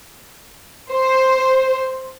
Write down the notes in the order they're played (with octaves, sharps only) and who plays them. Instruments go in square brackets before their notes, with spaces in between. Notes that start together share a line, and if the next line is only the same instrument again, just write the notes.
[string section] C5